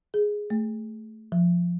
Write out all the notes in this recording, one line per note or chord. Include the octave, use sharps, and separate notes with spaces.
G#4
A3
F3